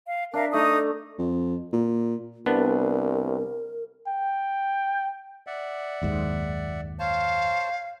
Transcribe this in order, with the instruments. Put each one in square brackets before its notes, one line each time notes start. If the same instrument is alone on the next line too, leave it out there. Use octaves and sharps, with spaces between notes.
[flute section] F5
[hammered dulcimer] D4 [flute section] A#4 E5 F5
[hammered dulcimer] A3 [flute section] D#4 D#6
[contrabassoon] F2
A#2
[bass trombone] C2 [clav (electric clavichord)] B3 D4 [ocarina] A#4
[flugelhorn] G5
[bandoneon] D5 E5 F#5
[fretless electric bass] F#1 D#2 G#2
[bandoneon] C5 C#5 A5 [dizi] F5